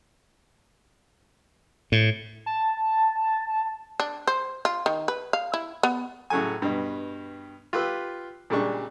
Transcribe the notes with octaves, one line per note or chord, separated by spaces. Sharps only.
A2
A5
D4
C5
F4
D#3
B4
F5
E4
B3
A2 C#3 F#3 A4 G#5
G2 B2
F4 G4 B4 E6
A#2 C#3 G3 G#3 D4 C#6